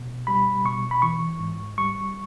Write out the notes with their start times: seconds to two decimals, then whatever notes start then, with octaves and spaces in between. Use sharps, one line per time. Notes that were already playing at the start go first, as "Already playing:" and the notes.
Already playing: B2
0.27 G3 B5
0.64 B2 C#6
0.91 B5
1.02 E3 C#6
1.40 G#2
1.78 G3 C#6